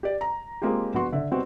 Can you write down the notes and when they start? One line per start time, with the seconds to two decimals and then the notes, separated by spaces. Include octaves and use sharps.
0.03 G4 D5
0.21 A#5
0.62 G#3 A#3 C4 F4 G4
0.94 A#1 B3 F#4 C6
1.12 D3 E5
1.31 G3 B3 C4 D#4 F#4